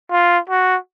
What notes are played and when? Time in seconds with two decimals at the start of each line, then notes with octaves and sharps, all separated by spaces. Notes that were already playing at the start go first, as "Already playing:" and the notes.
0.11 F4
0.50 F#4